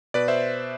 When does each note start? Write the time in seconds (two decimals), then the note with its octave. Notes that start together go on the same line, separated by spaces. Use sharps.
0.14 B2 B4 D5
0.28 C5 E5